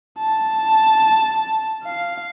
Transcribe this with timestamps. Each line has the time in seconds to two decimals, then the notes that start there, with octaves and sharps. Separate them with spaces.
0.19 A5
1.84 F5